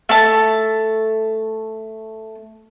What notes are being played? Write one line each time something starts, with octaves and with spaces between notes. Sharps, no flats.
A3 A5